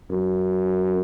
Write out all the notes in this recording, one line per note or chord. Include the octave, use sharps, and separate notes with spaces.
F#2